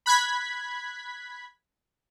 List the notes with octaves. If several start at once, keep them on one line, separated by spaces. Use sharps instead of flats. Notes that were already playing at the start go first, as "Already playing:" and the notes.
B5 F#6 G#6 B6